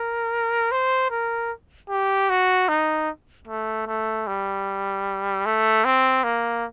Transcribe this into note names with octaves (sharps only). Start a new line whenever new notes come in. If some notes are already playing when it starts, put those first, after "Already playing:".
Already playing: A#4
C5
A#4
G4
F#4
D#4
A3
A3
G3
A3
C4
A#3